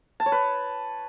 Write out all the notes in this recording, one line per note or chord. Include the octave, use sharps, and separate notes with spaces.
A5
C#5
B4